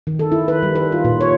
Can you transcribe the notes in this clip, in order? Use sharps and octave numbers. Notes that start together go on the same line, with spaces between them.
D#3
A4
E4
B4
G3
B4
F4
A#2
C#5